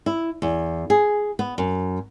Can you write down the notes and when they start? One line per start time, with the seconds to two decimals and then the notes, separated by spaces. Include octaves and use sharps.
0.06 E4
0.42 E2
0.90 G#4
1.39 B3
1.58 F#2